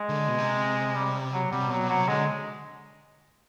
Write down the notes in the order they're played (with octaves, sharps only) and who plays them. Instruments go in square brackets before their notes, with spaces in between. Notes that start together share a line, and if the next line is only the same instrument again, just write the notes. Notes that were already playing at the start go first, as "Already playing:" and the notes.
Already playing: [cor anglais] G#3
[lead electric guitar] D3
B2
C3
[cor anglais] G3
F#3
[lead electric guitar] C3 [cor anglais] G3
[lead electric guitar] B2 [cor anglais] F#3
[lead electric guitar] B2
[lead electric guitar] C3 [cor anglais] F#3
[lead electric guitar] D3 [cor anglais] G#3